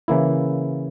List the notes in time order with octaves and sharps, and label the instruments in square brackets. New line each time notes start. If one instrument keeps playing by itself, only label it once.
[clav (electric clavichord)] C#3 E3 A#3 E4